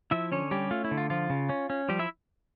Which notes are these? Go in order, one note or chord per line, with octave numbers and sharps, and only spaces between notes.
F3 E4 E5
D3 C#4 C#5
G3 C#4 G4
A3 F4
E4
D3
F4
F3 F4
C#3
C#4
C#4
F3 G3 G4
E4 E5